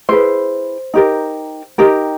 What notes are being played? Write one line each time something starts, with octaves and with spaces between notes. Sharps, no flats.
E4 G#4 B4 C5
D#4 G4 A#4
D#4 G4 A#4